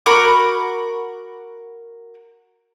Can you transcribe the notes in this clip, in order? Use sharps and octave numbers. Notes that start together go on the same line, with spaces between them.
F#4 A#4 B5 D6